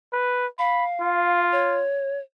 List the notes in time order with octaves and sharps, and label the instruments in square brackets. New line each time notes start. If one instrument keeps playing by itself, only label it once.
[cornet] B4
[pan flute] F5 [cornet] B5
[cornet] F4
[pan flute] C#5